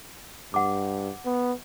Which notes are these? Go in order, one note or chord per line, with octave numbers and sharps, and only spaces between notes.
G2 F#5 D6
B3